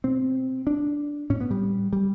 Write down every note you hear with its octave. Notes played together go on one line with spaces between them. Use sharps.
B2 C4
D4
A2 C#4
B3
G3
G3